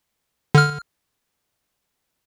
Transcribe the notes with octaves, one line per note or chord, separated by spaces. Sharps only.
D3 F6